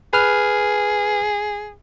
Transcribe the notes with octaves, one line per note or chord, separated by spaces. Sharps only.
G#4 B4 F6